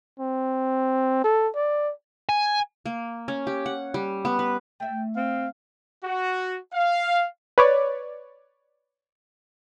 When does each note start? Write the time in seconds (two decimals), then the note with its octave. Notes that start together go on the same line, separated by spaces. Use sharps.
0.19 C4
1.24 A4
1.55 D5
2.29 G#5
2.86 A#3
3.28 C#4
3.47 G4
3.66 F#5
3.94 G3
4.25 B3
4.39 B4
4.80 A3 E5 G5
5.16 C4 F5
6.04 F#4
6.73 F5
7.58 B4 C#5 D5